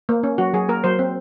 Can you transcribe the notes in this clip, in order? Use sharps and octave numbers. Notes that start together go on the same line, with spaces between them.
A#3
C#4
F#3 F#4
F#3 G#4
A#3 A#4
F#3 C5
C4